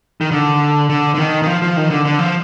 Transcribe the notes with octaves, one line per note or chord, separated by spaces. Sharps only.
D#3
D3
D3
D3
D#3
D#3
F3
F3
D#3
D3
D3
F3